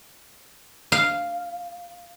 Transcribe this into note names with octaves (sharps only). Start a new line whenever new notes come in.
F5